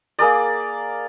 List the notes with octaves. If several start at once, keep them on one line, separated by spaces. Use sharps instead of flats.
A#3 G#4 A#4 D5